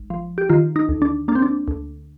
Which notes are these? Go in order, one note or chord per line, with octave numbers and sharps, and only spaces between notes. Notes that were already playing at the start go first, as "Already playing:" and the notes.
Already playing: G#1
F3
G4
D#3 F4
D#4
D2
D4
A#3 D4
C4
D4
D2